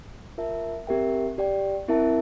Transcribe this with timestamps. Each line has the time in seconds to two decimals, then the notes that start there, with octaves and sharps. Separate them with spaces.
0.38 F4 A#4 E5 A5
0.87 C4 G4 A#4 E5 G5
1.38 G4 D5 G5
1.88 C4 E4 A#4 E5 A5